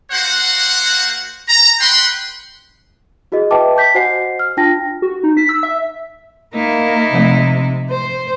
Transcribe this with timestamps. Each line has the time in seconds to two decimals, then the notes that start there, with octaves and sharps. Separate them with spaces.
0.11 A#3 F#4 C5 F#5
1.48 A#5
1.79 B4 F#5 G5 B5 C6
3.32 E4 F#4 G#4 D#5
3.51 B4 D#5 E5 G5 A5 D6
3.76 A5 D6 G6 B6
3.95 F#4 C5 D#5 F#5 G#5 C7
4.39 F6
4.57 D4 F4 G5 A5 A#6
5.02 F#4
5.23 D#4
5.37 B6
5.49 E6
5.63 E5
6.55 A#3 D#4 E4
7.13 C3 F3 G#3 A3
7.91 C5